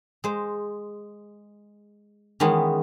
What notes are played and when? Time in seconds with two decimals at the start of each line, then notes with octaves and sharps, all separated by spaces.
0.24 G#3 C5
2.40 D#3 E3 G#3 B3 C#4